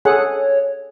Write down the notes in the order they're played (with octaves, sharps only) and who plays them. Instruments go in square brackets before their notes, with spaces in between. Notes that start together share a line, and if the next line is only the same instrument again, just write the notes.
[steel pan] G#4 A4 F#5 [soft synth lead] C#5